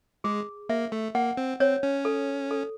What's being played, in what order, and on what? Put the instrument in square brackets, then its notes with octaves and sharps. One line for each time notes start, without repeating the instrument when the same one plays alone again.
[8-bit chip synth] G#3 [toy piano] G#4
[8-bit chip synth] A#3 [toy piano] E5
[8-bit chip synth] A3
[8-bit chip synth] A#3 [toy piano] F#5
[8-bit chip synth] C4
[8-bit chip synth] C4 [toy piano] C#5
[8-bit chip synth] C#4
[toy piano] A4
A4